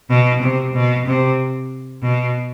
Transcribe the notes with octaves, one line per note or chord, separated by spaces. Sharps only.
B2
C3
B2
C3
B2